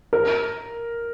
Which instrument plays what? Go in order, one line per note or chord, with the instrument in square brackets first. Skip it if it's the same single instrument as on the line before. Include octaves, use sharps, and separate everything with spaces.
[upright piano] A#4